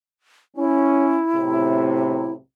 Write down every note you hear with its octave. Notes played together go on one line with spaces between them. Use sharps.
C#4 E4
B1 A2 C3